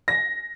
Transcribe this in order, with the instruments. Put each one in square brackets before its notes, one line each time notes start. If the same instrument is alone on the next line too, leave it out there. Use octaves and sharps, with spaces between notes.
[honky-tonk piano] A#6